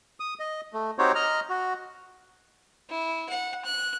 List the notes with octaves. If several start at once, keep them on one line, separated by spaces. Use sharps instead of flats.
D#6
D#5
A3
C4 D#4 F#4 G4 C5 C#5
D#5 A#5 F6
F#4
E4
F#5
F#6